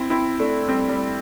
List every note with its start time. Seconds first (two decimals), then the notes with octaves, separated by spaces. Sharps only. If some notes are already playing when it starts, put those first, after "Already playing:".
Already playing: C4 E4
0.10 C4 E4
0.40 A3 D4
0.68 G3 C4
0.89 G3